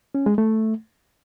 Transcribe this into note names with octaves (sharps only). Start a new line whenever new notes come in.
C#4
G#3
A3